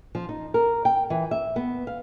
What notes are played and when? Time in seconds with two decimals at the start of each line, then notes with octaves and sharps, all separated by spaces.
0.15 F3
0.29 D#4
0.54 A#4
0.85 G5
1.10 E3
1.31 E5
1.56 B3
1.87 F5